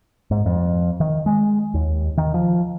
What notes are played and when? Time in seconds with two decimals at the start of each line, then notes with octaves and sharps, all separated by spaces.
0.31 G#2
0.46 F2
1.00 D#3
1.26 G#3
1.74 D#2
2.17 D#3
2.34 F3